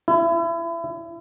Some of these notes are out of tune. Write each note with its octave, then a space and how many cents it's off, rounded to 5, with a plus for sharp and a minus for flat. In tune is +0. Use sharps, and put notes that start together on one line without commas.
E4 +30